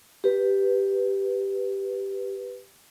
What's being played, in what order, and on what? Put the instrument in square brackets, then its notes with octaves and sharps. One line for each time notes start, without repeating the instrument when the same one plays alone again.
[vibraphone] G4 B4